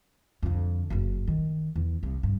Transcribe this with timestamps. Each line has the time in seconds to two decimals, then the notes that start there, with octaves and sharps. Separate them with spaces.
0.43 F2 D3
0.90 F#1 F#2
1.27 D#3
1.75 E2
2.03 C2
2.23 G2